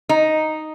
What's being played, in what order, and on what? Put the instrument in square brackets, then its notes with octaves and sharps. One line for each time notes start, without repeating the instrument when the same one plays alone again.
[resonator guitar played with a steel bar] D#4